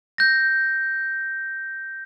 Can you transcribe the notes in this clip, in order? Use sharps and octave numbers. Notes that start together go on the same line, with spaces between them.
G6 A#6